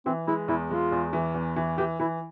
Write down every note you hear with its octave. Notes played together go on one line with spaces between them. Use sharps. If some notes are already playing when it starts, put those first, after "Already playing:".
E3 C4
G#3 E4
E2 E4
G#3 F4
E2
E3
E2
E3
E3 G4
E3 E4